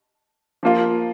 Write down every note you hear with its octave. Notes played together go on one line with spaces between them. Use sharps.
F3 A#3 F4